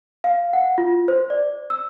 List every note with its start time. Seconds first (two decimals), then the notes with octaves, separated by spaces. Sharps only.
0.24 F5
0.53 F#5
0.78 F4
1.08 C5
1.30 D5
1.70 E6